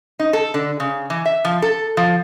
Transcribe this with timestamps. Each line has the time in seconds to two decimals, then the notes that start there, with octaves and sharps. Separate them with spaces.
0.19 D#4
0.33 A4
0.54 D3
0.80 C#3
1.10 E3
1.25 E5
1.45 F3
1.62 A4
1.97 F3